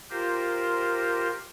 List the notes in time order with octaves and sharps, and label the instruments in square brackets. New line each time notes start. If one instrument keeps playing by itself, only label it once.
[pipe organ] F4 G4 A#4 C5